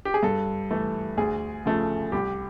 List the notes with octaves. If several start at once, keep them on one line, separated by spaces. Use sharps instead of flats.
G4
G#4
G2 A4
E3 A3
D2 G#4
C#3 F3 A3
C2 G4